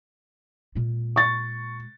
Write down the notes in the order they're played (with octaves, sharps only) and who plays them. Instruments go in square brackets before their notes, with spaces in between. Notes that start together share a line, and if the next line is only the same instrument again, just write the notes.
[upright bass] A#2 G#3
[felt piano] C#6 A6